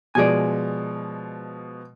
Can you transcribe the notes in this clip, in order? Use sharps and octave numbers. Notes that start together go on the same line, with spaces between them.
B2 F3 G#3 D5 G#5